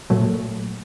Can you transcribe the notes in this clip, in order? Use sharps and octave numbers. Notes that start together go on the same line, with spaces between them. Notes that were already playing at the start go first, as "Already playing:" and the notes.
A#2 F#3 A3